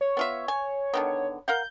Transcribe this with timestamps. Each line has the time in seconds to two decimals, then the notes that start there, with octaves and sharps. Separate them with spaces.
0.01 C#5
0.17 B3 F4 E5
0.48 G#5
0.94 D3 D#3 B3
1.48 A#4 F5 F#5 G6